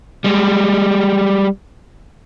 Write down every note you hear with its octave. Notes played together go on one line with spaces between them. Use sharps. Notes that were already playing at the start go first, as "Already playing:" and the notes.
G3 G#3